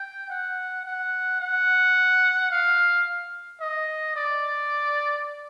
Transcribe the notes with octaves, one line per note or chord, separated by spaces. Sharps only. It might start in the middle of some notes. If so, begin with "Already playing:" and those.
Already playing: G5
F#5
F#5
F#5
F5
D#5
D5